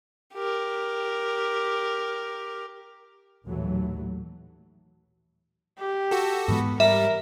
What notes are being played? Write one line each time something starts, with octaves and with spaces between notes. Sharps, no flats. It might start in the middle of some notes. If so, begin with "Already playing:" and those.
G4 A#4
A1 D#2 A#2 E3 F#3 A3
G4
F#4 A4
G#2 E3 G#3 B3
G3 A#4 E5